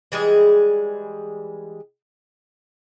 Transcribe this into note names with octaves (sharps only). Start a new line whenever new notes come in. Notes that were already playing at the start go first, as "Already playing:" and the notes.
E3 G3 G#3 G#4